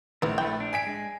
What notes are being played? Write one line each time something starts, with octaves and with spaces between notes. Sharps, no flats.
A#1 D#2 A2 D#3 E4 B4
A3 E4 G5
D4
G#5 B6 D7
G#3